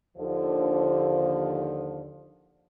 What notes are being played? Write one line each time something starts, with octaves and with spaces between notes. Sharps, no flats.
D#2 D3 F3